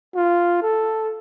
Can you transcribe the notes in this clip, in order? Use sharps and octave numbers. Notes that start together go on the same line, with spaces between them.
F4
A4